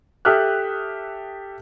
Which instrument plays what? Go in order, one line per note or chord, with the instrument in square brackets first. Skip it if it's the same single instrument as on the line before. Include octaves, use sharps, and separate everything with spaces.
[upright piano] G4 A4 E5 D#6 F6 F#6